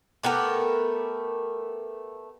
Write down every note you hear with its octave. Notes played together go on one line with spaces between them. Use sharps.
A3 B3 G4 A#4